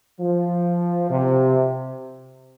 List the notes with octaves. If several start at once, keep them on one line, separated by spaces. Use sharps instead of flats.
F3
C3